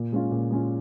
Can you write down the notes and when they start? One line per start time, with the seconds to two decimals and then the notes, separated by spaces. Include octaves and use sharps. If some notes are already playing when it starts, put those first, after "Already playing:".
Already playing: A#2
0.12 G#3 C#4 F4
0.31 A#2
0.51 G#3 C#4 F4